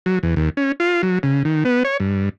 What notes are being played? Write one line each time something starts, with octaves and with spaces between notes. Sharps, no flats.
F#3
E2
D#2
C#4
F4
F#3
C#3
D#3
B3
C#5
G2